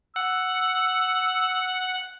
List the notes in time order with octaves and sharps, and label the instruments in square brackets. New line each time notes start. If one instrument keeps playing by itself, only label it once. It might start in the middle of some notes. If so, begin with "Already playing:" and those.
[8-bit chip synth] F#5 [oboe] E6